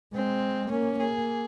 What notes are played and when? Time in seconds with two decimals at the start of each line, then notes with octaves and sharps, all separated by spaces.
0.14 G#3 C4
0.71 A#3 C#4
1.00 A#3 G#4